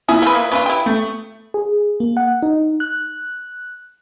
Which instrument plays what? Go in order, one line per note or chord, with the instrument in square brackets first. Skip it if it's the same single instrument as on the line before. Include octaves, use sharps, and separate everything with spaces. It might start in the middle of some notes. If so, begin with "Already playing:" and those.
[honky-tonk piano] A#2 E4 D#6 [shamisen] G#4
[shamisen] F3 B4
A#3
[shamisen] C#4 D4 F4 [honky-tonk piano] B4
[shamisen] E4 G4
[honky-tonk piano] A3
[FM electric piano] G#4
A#3
F#5
D#4
F#6